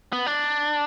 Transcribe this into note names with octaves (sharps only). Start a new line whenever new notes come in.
B3
D4